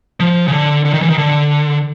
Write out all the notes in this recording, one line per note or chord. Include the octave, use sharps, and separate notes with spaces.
F3
C#3
D3
D3
D#3
E3
D#3
D3